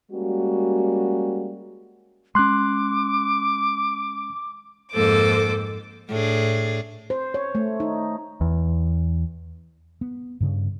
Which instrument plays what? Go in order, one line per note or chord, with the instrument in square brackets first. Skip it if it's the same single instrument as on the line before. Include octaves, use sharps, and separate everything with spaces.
[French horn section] G3 G#3 A#3 C#4 F#4
[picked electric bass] G#3 C#4 [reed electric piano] C6 F#6 [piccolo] D6
[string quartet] F2 G#2 A#3 A4 C5 D6
[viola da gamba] A2 D4 G#4
[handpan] C5
C#5
A3
D#4
[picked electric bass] E2
[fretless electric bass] B3
G2 C#3